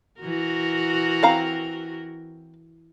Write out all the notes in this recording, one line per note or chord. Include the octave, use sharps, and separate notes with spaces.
E3 F#4 A#4
C4 F5 A#5